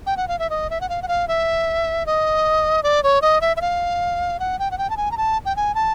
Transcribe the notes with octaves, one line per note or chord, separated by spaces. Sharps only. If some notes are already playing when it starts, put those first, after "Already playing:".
G5
F#5
F5
E5
D#5
E5
F#5
F5
F#5
F5
E5
D#5
D5
C#5
D#5
E5
E5
F5
F#5
G5
F#5
G5
A5
G#5
A#5
A5
G5
G#5
A5